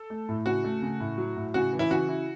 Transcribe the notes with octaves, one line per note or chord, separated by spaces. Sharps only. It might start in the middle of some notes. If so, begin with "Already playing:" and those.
Already playing: A4
A3
A2
C#3 F#4
A3
C#3
A2
F#3
A2
C#3 F#4
E3
E4
C#3 F#4
E4